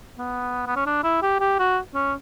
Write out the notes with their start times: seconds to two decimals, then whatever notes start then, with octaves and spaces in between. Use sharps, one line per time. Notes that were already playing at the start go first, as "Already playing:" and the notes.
0.18 B3
0.67 B3
0.76 C#4
0.86 D4
1.03 E4
1.22 G4
1.40 G4
1.59 F#4
1.95 C#4